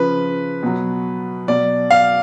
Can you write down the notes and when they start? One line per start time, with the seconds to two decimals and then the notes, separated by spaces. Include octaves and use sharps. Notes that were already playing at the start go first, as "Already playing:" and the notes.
Already playing: C#3 F3 B4
0.63 B2 F#3
1.47 B2 F#3 D5
1.91 F5